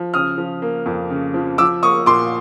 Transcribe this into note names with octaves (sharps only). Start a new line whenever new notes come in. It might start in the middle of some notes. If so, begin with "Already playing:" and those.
Already playing: F3
C#3 D#6 F6
F3
A#3
F2
C#3
F3
F3 D6 E6
A#3 C#6 D#6
A#2 C6 D6